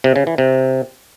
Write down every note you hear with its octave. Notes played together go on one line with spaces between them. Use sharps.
C3
C#3
E3
C3